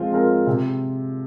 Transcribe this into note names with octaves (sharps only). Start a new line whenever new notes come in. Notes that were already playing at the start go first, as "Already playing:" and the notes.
Already playing: F3 G#3 C4 F4
G#3 C4 F4 A#4
C3